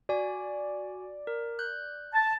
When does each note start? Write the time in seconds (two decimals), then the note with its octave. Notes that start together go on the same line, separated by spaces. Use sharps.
0.09 F#4 D5 G#5
1.27 A#4
1.59 F#6 G6
2.14 A5